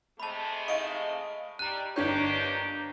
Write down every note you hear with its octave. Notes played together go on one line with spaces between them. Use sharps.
C3 G#3 A3 A5 B5
D#5 F5 C#6 D7
G3 A#5 F#6 D#7
G1 D#3 A#3 D4 G4 C#5 G6